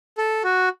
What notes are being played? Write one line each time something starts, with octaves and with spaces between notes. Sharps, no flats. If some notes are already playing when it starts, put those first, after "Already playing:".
A4
F#4